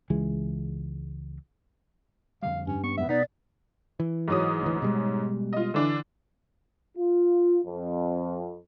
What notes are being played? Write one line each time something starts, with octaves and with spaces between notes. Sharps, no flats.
C#2 E3 G#3
F2 D3 G3 F5
G2 C#4
B3 C#4 C#6
F2 G#2 B3 E5
B2 B3 D#4 D5
E3
G#2 F#3 D#6
D2 E3
B2 G3 G#3
F4 D#5
D3 E3 D4
F4
F2